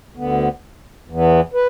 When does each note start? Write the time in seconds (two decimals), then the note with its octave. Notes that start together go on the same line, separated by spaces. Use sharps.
0.16 D2 D3 B3
1.08 E2 E3 B3
1.54 B4